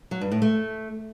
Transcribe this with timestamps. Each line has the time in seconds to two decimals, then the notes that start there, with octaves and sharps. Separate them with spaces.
0.11 F#3
0.21 G2
0.32 A2
0.42 A3